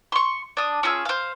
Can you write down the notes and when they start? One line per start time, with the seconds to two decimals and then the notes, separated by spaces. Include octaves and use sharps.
0.12 C6 C#6
0.57 D4 D#6
0.83 C#4 F4 G#4 E6
1.05 C5 F5